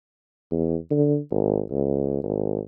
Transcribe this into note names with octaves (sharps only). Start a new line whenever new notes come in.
E2
D3
G#1
C#2
G#1